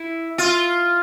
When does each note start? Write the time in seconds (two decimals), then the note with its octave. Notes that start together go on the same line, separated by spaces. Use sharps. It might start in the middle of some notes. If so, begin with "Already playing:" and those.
Already playing: E4
0.38 F4